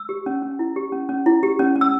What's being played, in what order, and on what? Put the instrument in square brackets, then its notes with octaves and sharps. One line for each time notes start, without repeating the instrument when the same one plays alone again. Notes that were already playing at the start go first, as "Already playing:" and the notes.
Already playing: [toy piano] E6
G4
C#4
C#4
E4
G4
C#4
C#4
E4
G4
C#4
C#4
E6